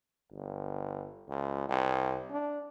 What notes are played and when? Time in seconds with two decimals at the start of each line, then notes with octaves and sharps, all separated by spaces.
0.32 G1
1.29 C#2
1.69 C2
2.30 D4